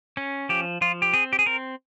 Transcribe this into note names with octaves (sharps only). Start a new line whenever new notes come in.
C#4
F3 G4
F3 F4
G4
C4 G#4
G4
G#4
C4 A#4